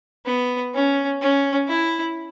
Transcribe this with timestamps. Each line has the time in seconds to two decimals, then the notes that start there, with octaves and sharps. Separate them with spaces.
0.26 B3
0.74 C#4
1.21 C#4
1.68 E4